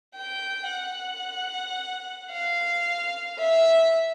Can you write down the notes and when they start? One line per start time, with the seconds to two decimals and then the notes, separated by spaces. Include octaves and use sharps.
0.15 G5
0.69 F#5
2.31 F5
3.38 E5